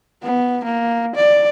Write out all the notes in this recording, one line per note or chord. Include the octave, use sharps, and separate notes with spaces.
B3
A#3
D5